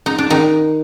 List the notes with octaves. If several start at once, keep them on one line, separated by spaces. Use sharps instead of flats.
D#4
D4
D#3 D#4